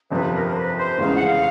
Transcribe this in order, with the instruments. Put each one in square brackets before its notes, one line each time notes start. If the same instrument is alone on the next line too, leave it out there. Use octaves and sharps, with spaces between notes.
[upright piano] G1 F2 C3 F3 [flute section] B4
[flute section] A#4
C5
B4
C5
[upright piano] F1 E2 C#3 E3 G#3 [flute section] F5
[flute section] F#5
F5